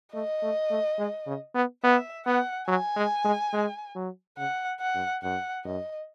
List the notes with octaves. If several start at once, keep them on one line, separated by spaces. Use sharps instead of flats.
A3 D#5
A3
A3
G#3
C#3
B3
B3 E5
B3 F#5
F#3 G#5
G#3
G#3
G#3
F#3
C#3 F#5
F#5
F#2
F#2 F#5
F#2 D#5